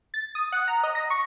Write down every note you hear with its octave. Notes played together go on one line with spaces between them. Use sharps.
A6
D#6
F#5
A#5
D#5
A#6
C#6